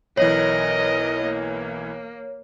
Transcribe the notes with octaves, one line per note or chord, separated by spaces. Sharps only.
B1 E3 A#4 C#5 D#5
A#3